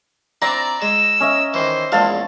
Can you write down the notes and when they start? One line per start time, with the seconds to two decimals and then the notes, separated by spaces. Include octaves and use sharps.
0.42 C4 D4 E4 D5 A#5
0.82 G#3 E6
1.20 C#4 D#5 E5
1.54 D#3 E3 C5
1.92 A#1 E2 G#3 F5 A5